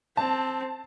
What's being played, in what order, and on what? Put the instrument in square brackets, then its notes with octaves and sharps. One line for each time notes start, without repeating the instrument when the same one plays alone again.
[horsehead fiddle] C4 [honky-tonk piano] A5